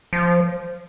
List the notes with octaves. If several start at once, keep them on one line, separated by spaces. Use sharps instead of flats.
F3